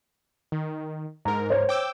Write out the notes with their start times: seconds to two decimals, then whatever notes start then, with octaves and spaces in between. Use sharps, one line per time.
0.52 D#3
1.25 G#2 A#4 A#5
1.50 C5 C#5
1.69 G5 D6 E6